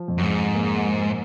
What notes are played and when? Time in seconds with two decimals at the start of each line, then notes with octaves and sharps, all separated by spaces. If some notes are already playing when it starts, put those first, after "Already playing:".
Already playing: F3
0.08 F2
0.18 F#2
0.23 G#2
0.55 A#3